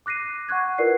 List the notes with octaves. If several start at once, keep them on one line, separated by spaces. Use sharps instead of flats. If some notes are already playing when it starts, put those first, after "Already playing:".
D6 F#6 A#6 C7 D#7
F#5 C#6 F#6 G#6
E4 F4 A#4 B4 D5 C7